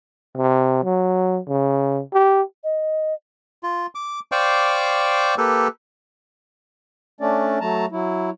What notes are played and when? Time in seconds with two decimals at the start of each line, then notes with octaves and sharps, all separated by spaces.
0.37 C3
0.84 F#3
1.48 C#3
2.13 G4
2.64 D#5
3.63 F4
3.95 D6
4.32 C5 D5 F5 G5 C#6 D6
5.38 A#3 G4 A4 B4
7.21 A3 C#4 D4 D5
7.61 F#3 A3 A5 A#5
7.92 F#3 E4